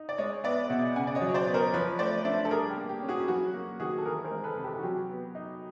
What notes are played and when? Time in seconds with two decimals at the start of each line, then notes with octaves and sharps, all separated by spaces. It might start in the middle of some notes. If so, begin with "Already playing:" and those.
Already playing: D#4
0.09 D5
0.18 G#3 C#5 D#5
0.44 B3 D5 E5
0.70 B2 E5 F#5
0.95 C#3 F#5 G#5
1.07 D5
1.15 C#5 D#5
1.21 F#3
1.29 C#5
1.34 C5 D5
1.47 B3
1.54 A#4 C5
1.74 F3 B4 C#5
1.99 A3 C5 D5
2.25 D4 D5 E5
2.45 A4
2.51 G3 G#4 A#4
2.70 G4
2.77 A#3
2.89 G4
3.02 C#4
3.08 F#4 G#4
3.28 F#3 F#4
3.54 A#3
3.80 D#3 F#4 G#4
3.98 A4
4.06 E3 G#4 A#4
4.25 A#4 C5
4.31 G#3
4.44 A4 B4
4.57 C3
4.64 G4 A4
4.79 F#4
4.83 F#3 G4
5.09 B3
5.35 D#4